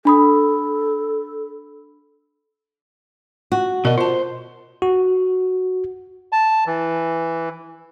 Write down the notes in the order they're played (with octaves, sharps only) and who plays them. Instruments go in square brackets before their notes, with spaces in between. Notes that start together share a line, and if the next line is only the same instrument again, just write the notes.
[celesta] D4 B5 D#6 [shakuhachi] A4
[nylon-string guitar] F#4
[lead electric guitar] B2 D#5 [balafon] A#4 D5
[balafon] F4 A5 [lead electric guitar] C5
[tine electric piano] F#4
[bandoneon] A5
E3